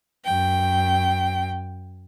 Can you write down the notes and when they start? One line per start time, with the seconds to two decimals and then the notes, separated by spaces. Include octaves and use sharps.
0.24 F#2 G5